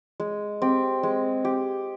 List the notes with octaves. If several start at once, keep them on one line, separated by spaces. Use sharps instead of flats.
G#3
C4 G4
G#3
G4